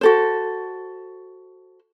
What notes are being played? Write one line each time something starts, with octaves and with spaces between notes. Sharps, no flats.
F#4 A4 C5